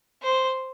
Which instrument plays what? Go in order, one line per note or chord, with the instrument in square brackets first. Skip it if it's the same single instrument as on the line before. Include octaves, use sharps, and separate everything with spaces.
[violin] C5